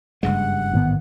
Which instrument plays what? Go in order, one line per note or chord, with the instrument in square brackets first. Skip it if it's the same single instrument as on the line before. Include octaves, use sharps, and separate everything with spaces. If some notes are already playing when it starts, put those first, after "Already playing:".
[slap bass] F#1 G2 G#3 [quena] F#5
[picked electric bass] A1 G#2 B3 [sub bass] D#3